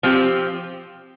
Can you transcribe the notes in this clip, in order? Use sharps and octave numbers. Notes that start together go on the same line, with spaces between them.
F3 C4 G4